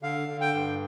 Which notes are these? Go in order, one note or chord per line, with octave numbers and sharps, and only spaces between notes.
D3 F5
D3
G5
G2